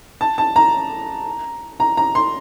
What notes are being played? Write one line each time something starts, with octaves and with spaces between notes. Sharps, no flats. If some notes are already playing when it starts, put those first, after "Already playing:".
A5
A5
A#5
A#5
A#5
C6